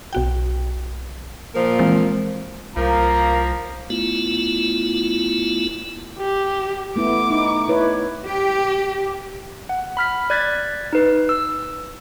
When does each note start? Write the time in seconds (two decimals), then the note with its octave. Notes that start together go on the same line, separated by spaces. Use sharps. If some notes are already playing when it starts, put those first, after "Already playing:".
0.13 B1 F#4 G5
1.55 A#2 F3 A#4
1.79 E3 G#3 C4
2.76 C2 F3 A#3 A#4 A#5
3.90 A3 B3 E4 F4
6.18 G4
6.96 A3 B3 E4 D6
7.31 D#4
7.68 E4 B4 C#5
8.26 G4
9.69 F#5
9.97 B5 F6 B6
10.30 D5 F#6 G#6 A6 B6
10.93 D#4 B4
11.29 E6